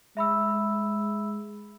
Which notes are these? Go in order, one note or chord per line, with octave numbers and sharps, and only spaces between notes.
G#3 E5 B5 E6